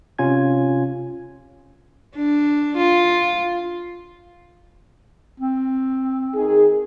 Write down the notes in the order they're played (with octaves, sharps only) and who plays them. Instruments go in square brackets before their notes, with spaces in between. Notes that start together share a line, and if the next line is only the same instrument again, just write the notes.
[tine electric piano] C3 C#4 F4 G#5 G#6
[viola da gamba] D4
F4
[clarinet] C4
[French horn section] D#3 G#4